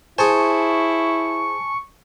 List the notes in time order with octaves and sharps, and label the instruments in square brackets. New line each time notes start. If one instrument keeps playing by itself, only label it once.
[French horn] E4 [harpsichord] G#4 C5 [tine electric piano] G#5 A5 [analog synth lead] C#6